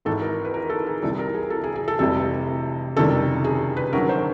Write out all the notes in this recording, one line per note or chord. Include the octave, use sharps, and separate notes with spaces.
G#1 G#2 E3 A4
A#4
B4
A#4
A4
G#4
C2 C3 E3 G3 A4
A#4
G#4
A4
G#4
G#4
A4
F1 F2 C3 E3 G3 A4
F#1 F2 C3 D#3 G3 A4
G#4
B4
G1 F#2 D#3 F#3 A#4
C5